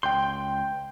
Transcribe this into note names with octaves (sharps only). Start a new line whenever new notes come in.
C#2 G5 C6 G6